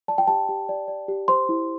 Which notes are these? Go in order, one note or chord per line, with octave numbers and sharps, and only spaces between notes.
D5 A5
G5
G4 A5
G4
D5
D5
G4
C5 C6
E4